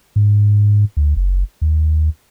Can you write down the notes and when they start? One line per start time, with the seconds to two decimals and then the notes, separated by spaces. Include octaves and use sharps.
0.16 G#2
0.97 D2
1.16 F#1
1.62 D#2